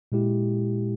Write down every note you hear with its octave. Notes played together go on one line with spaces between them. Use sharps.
A#2 G#3 E4 G4